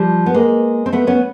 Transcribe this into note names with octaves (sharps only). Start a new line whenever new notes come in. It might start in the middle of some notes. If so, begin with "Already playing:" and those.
Already playing: F3 G3
B3
G#3 A#3
C4
A3 B3
B3 C#4